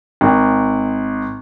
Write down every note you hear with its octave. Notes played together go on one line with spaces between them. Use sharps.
G#1